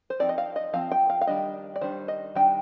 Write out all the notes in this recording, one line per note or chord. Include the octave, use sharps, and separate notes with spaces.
C5
F3 C4 D#4 D5
D#5
F5
D#5
F3 C4 F5
G5
F5
F5
D#3 G3 D4 D#5
D5
D#3 G3 D4 C5
D#5
D#3 G3 D4 G5